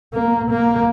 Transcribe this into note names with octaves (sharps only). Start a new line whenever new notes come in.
A#3
A#3